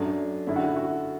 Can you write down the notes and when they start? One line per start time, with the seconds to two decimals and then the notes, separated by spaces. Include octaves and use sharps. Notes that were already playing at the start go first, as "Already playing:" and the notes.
Already playing: F#2 F#3 A3 D4
0.47 F#2 D3 A3 E4
0.56 F#4
0.66 E4
0.77 F#4